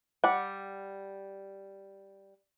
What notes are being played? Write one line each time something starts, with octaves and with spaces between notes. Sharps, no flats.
G3 F#5